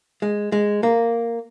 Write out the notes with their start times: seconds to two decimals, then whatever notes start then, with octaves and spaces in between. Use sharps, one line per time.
0.22 G#3
0.52 G#3
0.83 A#3